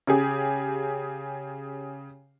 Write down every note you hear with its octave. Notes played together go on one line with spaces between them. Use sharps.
C#3 G4 G#4